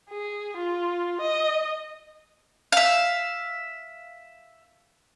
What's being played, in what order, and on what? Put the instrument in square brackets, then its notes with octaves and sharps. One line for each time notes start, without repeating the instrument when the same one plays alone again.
[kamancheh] G#4
F4
D#5
[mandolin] E5 F5